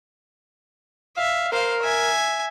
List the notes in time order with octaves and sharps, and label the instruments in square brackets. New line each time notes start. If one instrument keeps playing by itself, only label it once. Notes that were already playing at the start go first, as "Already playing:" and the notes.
[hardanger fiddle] E5 [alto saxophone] F5
[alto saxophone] A#4 [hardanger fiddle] C5 F5
[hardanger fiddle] E5 G#5